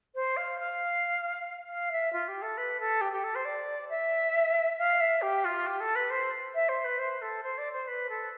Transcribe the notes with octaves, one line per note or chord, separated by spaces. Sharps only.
C5
F5
F5
F5
E5
F4
G4
A4
B4
A4
G4
G4
A4
C5
D5
E5
F5
E5
G4
F4
G4
A4
B4
C5
E5
C5
B4
C5
A4
C5
D5
C5
B4
A4